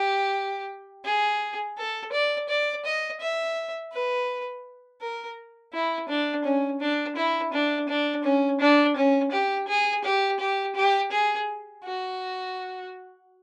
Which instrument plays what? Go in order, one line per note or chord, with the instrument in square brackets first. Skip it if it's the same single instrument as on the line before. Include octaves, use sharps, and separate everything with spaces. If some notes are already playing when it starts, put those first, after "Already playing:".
Already playing: [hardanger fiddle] G4
G#4
A4
D5
D5
D#5
E5
B4
A#4
E4
D4
C#4
D4
E4
D4
D4
C#4
D4
C#4
G4
G#4
G4
G4
G4
G#4
F#4